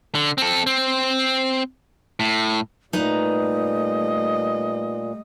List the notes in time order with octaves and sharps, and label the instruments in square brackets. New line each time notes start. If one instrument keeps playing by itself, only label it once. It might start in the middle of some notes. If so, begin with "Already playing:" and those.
[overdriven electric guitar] D3
C4 A4
C4
A2
[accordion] A#2 [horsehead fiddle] G3 D#5 [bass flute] A3 [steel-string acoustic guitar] D#4 B4 A#5